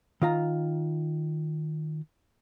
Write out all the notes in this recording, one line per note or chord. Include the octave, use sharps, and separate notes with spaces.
D#3 F4 A#5